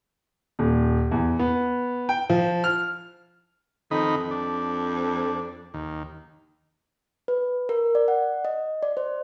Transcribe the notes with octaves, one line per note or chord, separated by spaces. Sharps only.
D#1
E2
B3
G5
F3
F6
F2 D#3 D#4 B5
D4
D#2
B4
A#4
D5
F#5
D#5
D5
C5